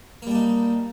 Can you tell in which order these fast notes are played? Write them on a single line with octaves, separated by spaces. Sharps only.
A#3 G3 D4 D#4